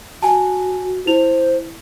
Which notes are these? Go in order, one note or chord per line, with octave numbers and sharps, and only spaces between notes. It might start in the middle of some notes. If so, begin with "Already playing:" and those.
F#4 G#5 A5
E4 C5 F7